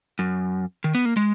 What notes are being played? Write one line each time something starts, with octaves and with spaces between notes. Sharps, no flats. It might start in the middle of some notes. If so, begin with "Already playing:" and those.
F#2
D#3
B3
A#3
G#3